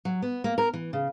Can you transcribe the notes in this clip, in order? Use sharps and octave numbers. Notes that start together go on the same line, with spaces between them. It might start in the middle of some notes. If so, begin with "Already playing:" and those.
F#3
B3
A#3
A#4
E3
C#3